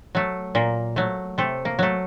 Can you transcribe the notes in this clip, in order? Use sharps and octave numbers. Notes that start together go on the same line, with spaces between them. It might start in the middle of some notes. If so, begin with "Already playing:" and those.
F#3 A3
A#2 A#3
F#3 A3
C3 A3
A#3
F#3 A3